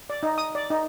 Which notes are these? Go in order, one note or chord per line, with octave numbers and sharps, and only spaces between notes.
D5
D#4
D#6
D5
D#4